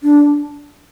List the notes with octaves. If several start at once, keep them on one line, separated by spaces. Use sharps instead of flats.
D4